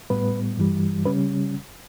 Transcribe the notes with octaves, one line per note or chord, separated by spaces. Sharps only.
A2 G3 B3 B4
G2 E3 G3
C#3 G3 C#4 B4